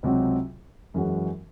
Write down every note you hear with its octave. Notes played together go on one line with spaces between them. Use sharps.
C#2 C3 F#3 C4 F#4
F#2 E3 G#3 C#4 F#4